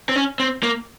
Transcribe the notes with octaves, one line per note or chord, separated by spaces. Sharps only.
C4
C#4
C4
A#3